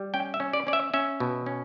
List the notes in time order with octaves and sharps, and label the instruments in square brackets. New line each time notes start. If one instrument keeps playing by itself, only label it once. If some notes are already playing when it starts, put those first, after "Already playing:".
Already playing: [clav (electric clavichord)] G3
C#4 G5
E5
C#4
D5
C#4 D5
E5
C#4 E5
B2
C#4